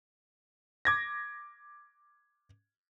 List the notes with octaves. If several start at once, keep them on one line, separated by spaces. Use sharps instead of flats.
D6 G#6 A#6